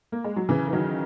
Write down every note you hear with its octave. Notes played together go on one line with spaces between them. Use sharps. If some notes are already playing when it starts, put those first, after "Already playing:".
A#3
G#3
F#3
C#3 E3
E3
D#3 F#3